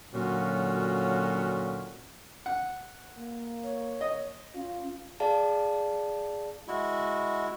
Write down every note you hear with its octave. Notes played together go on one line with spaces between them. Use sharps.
A#2 D3 F#3 C#4 F4 F#4
F#5
A#3
C#5
D#5
C#4 F4
G#4 D5 F5 A5
G#3 E4 F#4